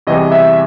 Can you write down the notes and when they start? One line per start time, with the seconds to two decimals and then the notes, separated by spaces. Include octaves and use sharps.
0.07 E2 C3 E3 G3 D#5
0.32 E5